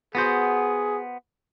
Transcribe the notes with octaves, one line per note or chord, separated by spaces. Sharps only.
B3 F#4 G#4 C5